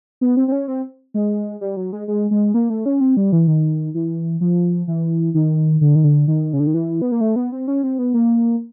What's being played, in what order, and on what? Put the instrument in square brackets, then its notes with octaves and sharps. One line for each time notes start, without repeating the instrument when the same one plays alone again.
[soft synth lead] B3
C4
C4
C#4
C4
G#3
G3
F#3
G#3
G#3
G#3
A#3
A3
C#4
C4
G3
E3
D#3
E3
F3
E3
D#3
D3
D#3
D3
D#3
C#3
D3
D#3
E3
B3
A#3
A3
B3
C4
C#4
C4
B3
A#3